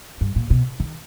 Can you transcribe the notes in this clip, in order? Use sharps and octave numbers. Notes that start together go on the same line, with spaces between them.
G2
A#2
B2
D#3